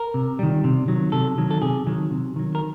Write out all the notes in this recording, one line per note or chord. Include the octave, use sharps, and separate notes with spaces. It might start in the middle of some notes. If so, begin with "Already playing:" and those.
Already playing: A#4
C3
D#3 G3
C3
D#3 F#3
C3 A4
D#3 F#3
A4
C3 G#4
D#3 F#3
C3
D#3 F#3
A#4